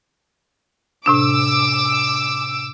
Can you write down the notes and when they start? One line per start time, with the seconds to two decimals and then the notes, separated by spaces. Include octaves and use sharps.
1.06 A2 C3 D4 D6 E6